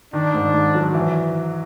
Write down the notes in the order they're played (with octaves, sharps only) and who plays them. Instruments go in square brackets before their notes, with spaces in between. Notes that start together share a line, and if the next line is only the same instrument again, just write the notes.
[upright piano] D#3 [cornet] D4
[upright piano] G#2
G#2
F#3
E3